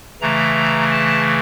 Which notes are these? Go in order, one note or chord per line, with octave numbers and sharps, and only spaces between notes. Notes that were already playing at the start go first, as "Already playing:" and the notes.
C#3 E3 A3 A#5
A5